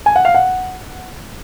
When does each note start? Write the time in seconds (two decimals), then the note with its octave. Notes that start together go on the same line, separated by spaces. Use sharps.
0.06 G#5
0.16 F#5
0.25 F5
0.35 F#5